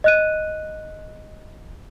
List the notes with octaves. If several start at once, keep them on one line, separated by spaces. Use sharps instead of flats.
D#5 F#6 D#7